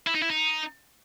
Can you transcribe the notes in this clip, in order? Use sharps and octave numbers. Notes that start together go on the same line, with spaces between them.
E4
D#4
E4
D#4